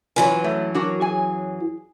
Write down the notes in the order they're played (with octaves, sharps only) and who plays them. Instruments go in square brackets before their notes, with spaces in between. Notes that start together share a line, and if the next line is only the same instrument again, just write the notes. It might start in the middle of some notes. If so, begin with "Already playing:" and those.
[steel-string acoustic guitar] F#2 E3 F#3 [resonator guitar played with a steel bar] F4 B4 G#5
[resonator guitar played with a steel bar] A3
D4 F#4 A#4
G#4 G#5